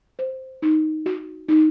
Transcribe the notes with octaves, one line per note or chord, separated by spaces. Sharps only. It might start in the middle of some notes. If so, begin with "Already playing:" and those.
C5
D#4
F#4
D#4